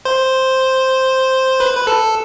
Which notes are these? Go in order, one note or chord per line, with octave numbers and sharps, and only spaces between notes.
C5
B4
B4
A4